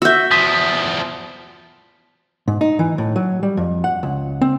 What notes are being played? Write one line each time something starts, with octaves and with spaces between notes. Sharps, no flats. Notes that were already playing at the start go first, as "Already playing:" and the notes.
F#4 E5 E6 G6
E2 F3 D#6 B6
G#2
D#4
E3
A2
F#3
G3
F2
F#5
C#2
C4